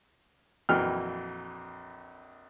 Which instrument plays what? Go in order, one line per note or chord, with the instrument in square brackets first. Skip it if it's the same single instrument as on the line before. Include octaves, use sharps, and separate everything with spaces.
[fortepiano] A#1 F2 E3 F#3 G5 F6